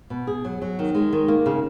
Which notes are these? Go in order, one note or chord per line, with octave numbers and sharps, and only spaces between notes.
B2
G#4
F#3
F#3
D#3
G#3
D#3
A#3
C#3